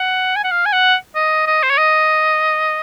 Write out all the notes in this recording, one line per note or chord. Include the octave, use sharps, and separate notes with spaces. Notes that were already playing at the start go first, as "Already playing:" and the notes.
Already playing: F#5
G#5
F#5
F5
G#5
F#5
D#5
D#5
C5
C#5
D#5